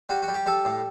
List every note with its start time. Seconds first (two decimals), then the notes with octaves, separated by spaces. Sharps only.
0.09 G3 F#4
0.22 F#4
0.28 G3
0.34 G4
0.46 G3 A4
0.65 A2